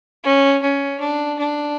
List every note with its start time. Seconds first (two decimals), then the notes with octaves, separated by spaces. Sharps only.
0.24 C#4
0.62 C#4
0.99 D4
1.39 D4